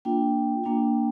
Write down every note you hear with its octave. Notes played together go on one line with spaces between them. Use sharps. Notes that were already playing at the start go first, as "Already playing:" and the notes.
A#3 D4 F4 G5
A#3 D4 F4